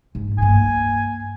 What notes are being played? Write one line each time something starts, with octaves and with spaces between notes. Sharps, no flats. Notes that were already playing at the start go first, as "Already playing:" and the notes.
G#2
G2 A#3 G#5